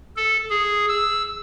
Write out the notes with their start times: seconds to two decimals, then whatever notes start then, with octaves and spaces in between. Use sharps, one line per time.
0.16 A4
0.50 G#4
0.88 E6